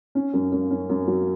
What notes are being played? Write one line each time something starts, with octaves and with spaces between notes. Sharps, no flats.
C#4
F#2
F#2
C#4
F#2
F#3